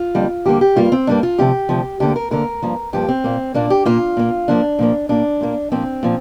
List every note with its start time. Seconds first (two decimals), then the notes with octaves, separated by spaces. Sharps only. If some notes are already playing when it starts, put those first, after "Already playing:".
Already playing: F4
0.14 F2 D3 G3 A#3
0.46 F2 D3 G3 A#3 G4
0.61 G4
0.76 G2 G3 A#3 F4
0.92 C4
1.07 G2 G3 A#3 D4
1.23 F4
1.38 D2 C3 F3 G4
1.69 D2 C3 F3
2.00 D2 D3 A#3 G4
2.16 A#4
2.31 D2 D3 A#3 A#4
2.63 G2 F3 A#3
2.93 G2 F3 A#3 G4
3.09 C4
3.24 A#2 A#3
3.54 A#2 A#3 D4
3.70 G4
3.85 A#2 A#3 F4
4.17 A#2 A#3
4.48 A#2 F3 A#3 D4
4.79 A#2 F3 A#3
5.09 A#2 A#3 D4
5.41 A#2 A#3
5.72 A#2 F3 A#3 C4
6.03 A#2 F3